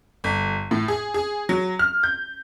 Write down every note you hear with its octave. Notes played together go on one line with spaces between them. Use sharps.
G1
A2
G#4
G#4
F#3
F6
G6